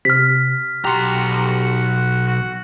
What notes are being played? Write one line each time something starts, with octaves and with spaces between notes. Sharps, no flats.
C3 F6 B6
B1 F#4 G4 A#5 C6 C#7
F#4